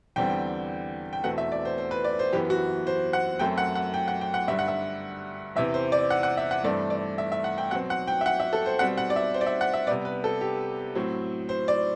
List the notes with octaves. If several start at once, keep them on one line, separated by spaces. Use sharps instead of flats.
E2 D3 G3 C4 G5
G5
E2 B2 A3 C4 F#5
E5
D5
C5
C5
B4
D5
C5
F#2 E3 B3 G4
F#4
C5
F#5
F#2 F#3 A3 C4 G5
F#5
F#5
G5
F#5
G5
F#5
G2 D3 G3 E5
F#5
E5
E2 C3 E3 E5
C5
D5
F#5
F#5
E5
F#5
G2 E3 A3 C4 D5
D5
E5
E5
F#5
G5
B2 F#3 C4 F#5
F#5
G5
E5
F#5
E5
A4
C5
B2 G3 C4 F#5
F#5
D5
E5
C5
D5
E5
F#5
E5
C3 G3 B3 D5
B4
A4
G4
A2 F#3 C4
C5
D5